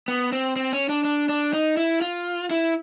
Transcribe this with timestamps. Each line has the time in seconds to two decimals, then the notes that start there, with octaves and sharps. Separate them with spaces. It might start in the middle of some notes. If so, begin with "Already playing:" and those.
0.08 B3
0.32 C4
0.56 C4
0.73 C#4
0.89 D4
1.05 D4
1.29 D4
1.53 D#4
1.77 E4
2.01 F4
2.51 E4